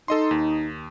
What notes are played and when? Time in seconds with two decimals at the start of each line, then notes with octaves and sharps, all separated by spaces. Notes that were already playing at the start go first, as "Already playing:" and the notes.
0.08 D#4 A4 D#5 C6
0.31 D#2